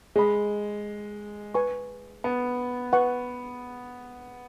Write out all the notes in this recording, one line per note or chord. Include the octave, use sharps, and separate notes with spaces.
G#3 G#4 D#5 B5
B4 G#5 C#6
B3
B4 F#5 C#6